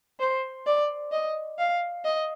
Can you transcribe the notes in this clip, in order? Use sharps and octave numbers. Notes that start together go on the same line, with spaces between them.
C5
D5
D#5
F5
D#5